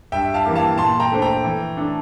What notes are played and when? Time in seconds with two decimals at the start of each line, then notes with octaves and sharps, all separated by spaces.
0.12 G2 E5 G5
0.34 F5 A5
0.45 E3 A#3 E4 G4
0.56 F5 A5
0.78 A#2 A5 C6
1.00 G5 A#5
1.12 A3 D4 A4 C5
1.22 G5 A#5
1.44 E3
1.77 A3 D4 A4